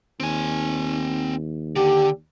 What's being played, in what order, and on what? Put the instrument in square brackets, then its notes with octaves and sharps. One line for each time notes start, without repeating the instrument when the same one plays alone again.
[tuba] D#2 [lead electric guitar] C4 G#5
[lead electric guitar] D3 [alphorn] G4